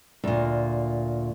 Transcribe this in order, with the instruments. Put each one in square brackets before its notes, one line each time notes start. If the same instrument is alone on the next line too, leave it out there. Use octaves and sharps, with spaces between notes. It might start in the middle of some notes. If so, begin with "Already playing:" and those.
[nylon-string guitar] D2 A#2